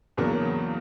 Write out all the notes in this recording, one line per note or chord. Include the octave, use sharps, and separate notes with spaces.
E2 C#3 F#3 A#3 D4